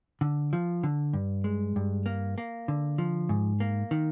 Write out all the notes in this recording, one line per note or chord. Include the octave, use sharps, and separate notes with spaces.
D3
F3
D3
G2
G#3
G2
A#3
A#3
D3
F3
G#2
A#3
D#3